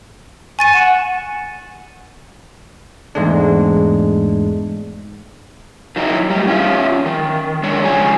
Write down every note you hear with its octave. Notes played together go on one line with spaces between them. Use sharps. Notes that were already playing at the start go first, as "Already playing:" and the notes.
G#5 C#6 A6 D#7
F#5 E7
E2 G#2 G#3 A3 D4
D#3 F#3 D#4 E4
A2 G3
C#4 F4 E5
D#3
G#3 D4 C#5
C#3 F3 G#5